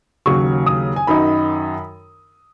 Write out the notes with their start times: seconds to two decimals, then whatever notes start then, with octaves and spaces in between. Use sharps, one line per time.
0.26 D#2 C#3 F#3 C#6
0.66 D#6
0.96 G#5
1.07 F#2 D#3 F#3 D#4 B5